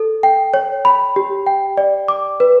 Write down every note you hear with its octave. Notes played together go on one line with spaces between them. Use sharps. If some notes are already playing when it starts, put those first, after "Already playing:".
Already playing: A4
G5
C#5
B5
G4
G5
D5
D6
B4